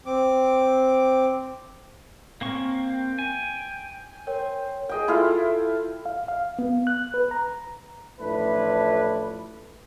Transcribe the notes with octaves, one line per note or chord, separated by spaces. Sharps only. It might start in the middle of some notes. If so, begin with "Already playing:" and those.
C4 D6
A#3 C4 C#4 C#6
G5
G#5
A#4 C5 C#5 G5
G#4 D#5 G5
E4 F4 A4 F5
F5
F5
B3
F#6
B4
A#5
A1 F3 A3 D4 E4 B4